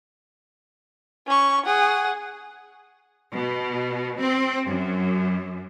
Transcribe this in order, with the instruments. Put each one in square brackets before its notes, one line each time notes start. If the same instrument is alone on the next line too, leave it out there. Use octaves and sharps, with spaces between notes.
[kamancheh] C#4 C#6
G#4 F#5
[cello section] B2
C4
F#2